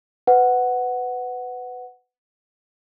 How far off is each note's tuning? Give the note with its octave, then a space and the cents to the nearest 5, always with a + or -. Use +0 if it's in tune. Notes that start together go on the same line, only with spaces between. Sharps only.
B4 +20 F#5 +0